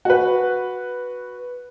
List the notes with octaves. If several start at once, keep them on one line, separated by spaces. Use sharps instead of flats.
F#4 B4